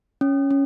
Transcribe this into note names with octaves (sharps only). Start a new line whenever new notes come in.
C#4
C#4